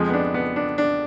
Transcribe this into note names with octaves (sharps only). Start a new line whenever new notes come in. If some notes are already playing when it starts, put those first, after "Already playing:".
Already playing: F2 F3 G#3
B3
D4
B3
D4
D4